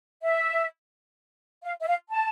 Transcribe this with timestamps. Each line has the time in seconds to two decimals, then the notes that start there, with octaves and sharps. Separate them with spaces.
0.23 E5
1.63 F5
1.81 E5
1.87 F5
2.10 A5